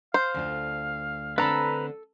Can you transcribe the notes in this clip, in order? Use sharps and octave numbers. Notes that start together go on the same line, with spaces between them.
C5 F5
D2 D4 F4
D3 C4 D4 A4 B4 A#5 B5